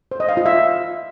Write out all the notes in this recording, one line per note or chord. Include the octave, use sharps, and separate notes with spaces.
C5
D#5
F5
F4
E5